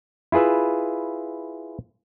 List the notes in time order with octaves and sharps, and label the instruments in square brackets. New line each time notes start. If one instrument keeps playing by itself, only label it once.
[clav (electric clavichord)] E4 F4 G#4 B4 E5